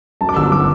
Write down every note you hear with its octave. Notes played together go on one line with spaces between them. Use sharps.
F#2 A5
D6
G1 E6
F#3 D6